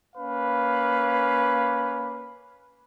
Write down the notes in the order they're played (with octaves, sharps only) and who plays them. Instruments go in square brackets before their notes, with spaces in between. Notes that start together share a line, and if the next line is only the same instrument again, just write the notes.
[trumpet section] A#3 C#4 B4 F5